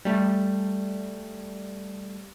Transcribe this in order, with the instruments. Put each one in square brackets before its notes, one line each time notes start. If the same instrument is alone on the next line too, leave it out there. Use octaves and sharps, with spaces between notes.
[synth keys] G3 A3